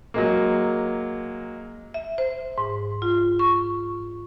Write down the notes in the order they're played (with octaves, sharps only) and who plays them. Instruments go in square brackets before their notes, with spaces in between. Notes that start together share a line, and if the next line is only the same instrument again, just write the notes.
[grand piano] F#3 G#3 A#3
[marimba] E5
C5
G#2
F4
C#6